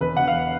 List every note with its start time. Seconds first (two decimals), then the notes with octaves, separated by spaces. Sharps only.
0.01 E1 B4
0.17 E1 F#5
0.28 F5